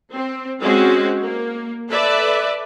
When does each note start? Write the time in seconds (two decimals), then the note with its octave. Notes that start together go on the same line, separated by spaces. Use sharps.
0.13 C4
0.62 G#3 C4 C#4 F#4
1.22 A#3
1.90 A4 B4 D5 E5